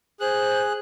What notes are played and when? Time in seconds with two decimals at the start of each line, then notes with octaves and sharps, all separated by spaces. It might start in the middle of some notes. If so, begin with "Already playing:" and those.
0.20 G#4 C5 F#6